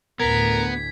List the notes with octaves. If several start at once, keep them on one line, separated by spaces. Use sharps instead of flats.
D2 A2 B3 A#4 G#6 B6